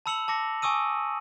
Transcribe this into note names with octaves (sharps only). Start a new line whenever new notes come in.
A5 B5 E6 C#7 F7 F#7
A5 D6 A#6 C#7
G#5 C#6 D#6 E6 D#7